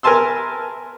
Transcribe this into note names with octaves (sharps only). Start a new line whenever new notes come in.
A#4 B4 G#5 A5 C6 E6